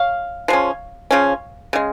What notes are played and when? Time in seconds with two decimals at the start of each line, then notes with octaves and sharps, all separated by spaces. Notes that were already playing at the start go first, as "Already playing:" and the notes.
Already playing: C#5 F5
0.48 F3 G#3 C#4
1.11 C#3 F3 C#4
1.73 C#3 G#3